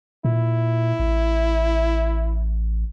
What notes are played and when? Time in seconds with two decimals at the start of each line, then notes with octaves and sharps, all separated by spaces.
0.25 A#2 E4
1.00 A1